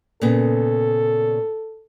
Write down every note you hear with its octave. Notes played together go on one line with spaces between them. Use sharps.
A#2 C#3 B3 A4